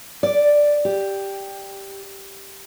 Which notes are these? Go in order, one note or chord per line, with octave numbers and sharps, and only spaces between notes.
D5
G4